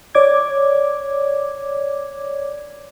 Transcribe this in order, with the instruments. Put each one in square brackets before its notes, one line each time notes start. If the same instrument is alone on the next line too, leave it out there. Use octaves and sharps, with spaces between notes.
[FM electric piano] C#5 D5 D6 G#6